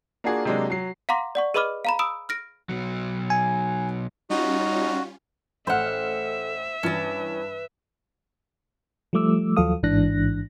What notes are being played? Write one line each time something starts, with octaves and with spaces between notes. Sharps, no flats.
A#3 D4 F4 F#4 G#4
C3 F#3 G#3 A#3 D4
F#3 C7
F5 F#5 A#5 C6 D6 A#6
D5 F#5 C#6
G#4 B4 D#5 B5 D6 F6
F5 A#5 B5
B5 D#6 E6 D7
F6 A#6 D7
B2 F#3
G#5
G3 C#4 D#4 F4 F#4
A1 A4 C5 E5 F#5 F6
G2 E3 C#4 B4 D5
F3 G3 A3 D6 E6
D#2 F3 F#3 A4 F5 D#6
A1 G#2 E3 D4 F#6 A#6